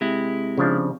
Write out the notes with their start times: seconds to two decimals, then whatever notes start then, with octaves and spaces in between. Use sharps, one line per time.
0.01 C3 G#3 E4
0.58 C#3 F3 D4